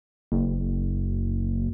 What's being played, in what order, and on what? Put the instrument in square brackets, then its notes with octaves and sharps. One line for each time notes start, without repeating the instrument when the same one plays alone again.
[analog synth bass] F#1